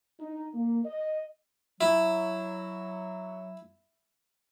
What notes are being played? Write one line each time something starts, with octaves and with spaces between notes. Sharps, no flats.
D#4
A#3
D#5
F#3 E4